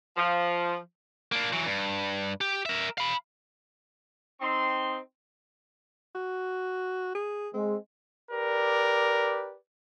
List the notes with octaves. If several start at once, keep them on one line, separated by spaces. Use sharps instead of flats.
F3
A#3 D4
E3 F#3
G2
G4
A#4 E5
F5 B5
C4 D#4 C6
F#4
G#4
G#3 C4
G4 A#4 B4 D5